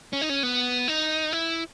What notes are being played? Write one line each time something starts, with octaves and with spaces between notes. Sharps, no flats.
C#4
D#4
C#4
B3
D#4
E4